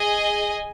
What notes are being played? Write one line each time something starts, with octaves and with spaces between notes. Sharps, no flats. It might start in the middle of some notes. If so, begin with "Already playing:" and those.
Already playing: G#4 D#5 G#5